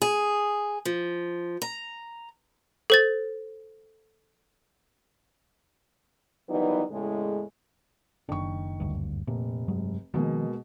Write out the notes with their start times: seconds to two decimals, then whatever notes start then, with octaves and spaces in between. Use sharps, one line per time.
0.02 G#4
0.85 F3
1.62 A#5
2.90 A4 C5 A6
6.49 D#3 E3 F#3 G3 B3 D#4
6.91 E2 A2 C#3 G#3
8.29 F#1 D#3 D4 C#6
8.80 F#1 D2 G2
9.27 F1 A#2
9.68 G2 F#3 G#3
10.14 B2 D#3 F3 G#3 A#3